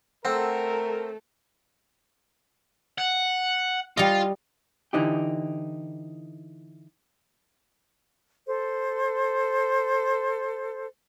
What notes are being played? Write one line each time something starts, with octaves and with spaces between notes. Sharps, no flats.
A3 C4 A4 A#4 F#5 C6 E6
F#5
G3 F4 D#5
D3 E3 D#4 G4
A4 C5